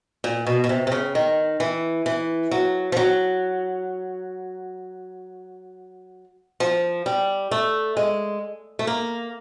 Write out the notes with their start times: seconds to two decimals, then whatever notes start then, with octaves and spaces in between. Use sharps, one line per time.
0.24 A#2
0.46 B2
0.64 B2
0.69 C3
0.87 C3
0.92 C#3
1.15 D#3
1.60 E3
2.06 E3
2.51 F#3
2.92 F3
2.97 F#3
6.60 F3
7.06 G3
7.51 A3
7.97 G#3
8.79 A3
8.87 A#3